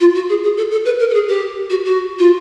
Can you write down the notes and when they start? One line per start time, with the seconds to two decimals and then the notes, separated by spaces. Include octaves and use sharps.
0.01 F4
0.15 F#4
0.29 G#4
0.43 G#4
0.57 A4
0.71 A4
0.85 B4
0.99 A#4
1.10 A4
1.14 G#4
1.28 G4
1.70 F#4
1.85 F#4
2.19 F4